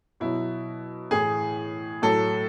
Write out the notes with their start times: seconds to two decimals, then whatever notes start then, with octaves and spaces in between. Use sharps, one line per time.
0.20 B2 F#3 E4
1.11 A2 E3 G#4
2.02 A2 F#3 A4